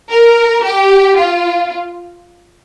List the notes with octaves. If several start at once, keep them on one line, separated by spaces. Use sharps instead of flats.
A#4
G4
F4